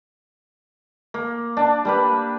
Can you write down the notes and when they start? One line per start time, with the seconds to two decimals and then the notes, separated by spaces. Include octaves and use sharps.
1.14 A#3
1.57 D4 A5
1.85 G3 A#3 B4